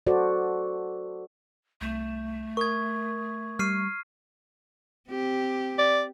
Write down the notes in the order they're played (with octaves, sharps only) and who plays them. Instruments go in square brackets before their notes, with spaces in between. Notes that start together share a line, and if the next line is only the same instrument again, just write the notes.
[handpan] F#4 A4 C5 D5
[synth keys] C2 G6 E7 [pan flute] A3
[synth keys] A#4 D#6 [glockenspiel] C#6 G#6
[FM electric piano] G3 C#6 [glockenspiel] F6 C7 D#7
[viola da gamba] C4 G4
[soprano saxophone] D5